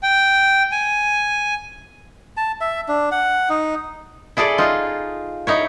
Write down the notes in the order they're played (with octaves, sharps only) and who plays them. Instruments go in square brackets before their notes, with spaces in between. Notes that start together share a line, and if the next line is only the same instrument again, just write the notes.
[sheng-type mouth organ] G5
G#5
[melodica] A5
E5
D4
F#5
D#4
[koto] E4 G#4 A4 D5
D#4 F4
D#4 E4 C#5